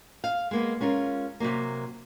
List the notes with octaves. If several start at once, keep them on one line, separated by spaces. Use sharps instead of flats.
F5
G#3 A#3 B3
G#3 C#4 F4 A#4
C3 F3 F#3 A#3